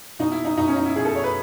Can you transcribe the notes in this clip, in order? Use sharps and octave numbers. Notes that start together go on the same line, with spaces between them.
B2 D#4
E4
D#4
B2 D#4
C#4
D#4
E4
B2 G#4
A4
C#5
B4